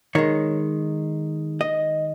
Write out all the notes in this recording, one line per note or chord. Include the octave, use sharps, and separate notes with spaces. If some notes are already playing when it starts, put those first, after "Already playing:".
D#3 G#3 C#5
D#5